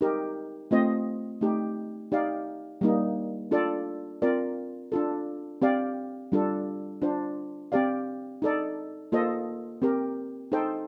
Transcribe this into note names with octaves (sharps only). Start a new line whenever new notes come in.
D#4 G4 A#4
A3 C4 F4 C5 D#5
A3 D#4 G4
D#4 G4 D5 F5
G3 A#3 D#4
D4 F4 A4 D5
C4 F4 A#4 D5
D4 F4 A4
C4 G4 D5 F5
G3 D4 F4 A4
D4 F4 C5
C4 G4 D5 F5
D#4 A4 D5
A#3 F4 A4 C5 D#5
C4 G4 A#4
D#4 A4 C5 G5